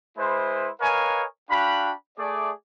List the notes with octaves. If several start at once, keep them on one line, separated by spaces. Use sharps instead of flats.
G#3 E4 B4 C5
A#4 B4 C#5 D#5 F5 G#5
D4 F#4 F5 G5 B5
A3 G#4 D5